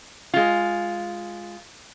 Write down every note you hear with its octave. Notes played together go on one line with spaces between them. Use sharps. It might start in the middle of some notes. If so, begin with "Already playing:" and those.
G#3 F4